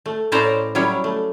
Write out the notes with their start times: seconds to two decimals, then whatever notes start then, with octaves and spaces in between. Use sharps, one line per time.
0.06 A3
0.32 A2 C#4 E4 C5 D5 A#5
0.75 F#3 G3 C#4 E4 C#5
1.04 A3